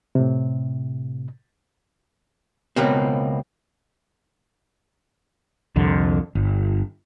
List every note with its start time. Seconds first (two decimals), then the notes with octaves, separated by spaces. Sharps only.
0.15 A2 C3
2.76 C#2 B2 A#3 C4
5.76 C2 F2 D3
6.35 G1